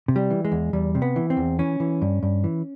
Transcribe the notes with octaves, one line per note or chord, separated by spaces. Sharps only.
C3
G3
E3
G#3
E2
E2 G3
C3
B3
E3
C4
E2
E3 C#4
E3
G2
G2
E3